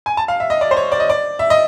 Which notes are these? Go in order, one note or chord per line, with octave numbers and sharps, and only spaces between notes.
G#5
A5
F5
E5
D#5
D5
C5
C#5
D5
D#5
D5
E5
D#5